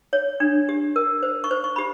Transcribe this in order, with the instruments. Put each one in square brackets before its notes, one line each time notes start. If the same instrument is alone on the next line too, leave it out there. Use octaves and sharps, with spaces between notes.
[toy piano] C#5
D4
G4
A#4
C5
C#6
C5
C#6
G4 B5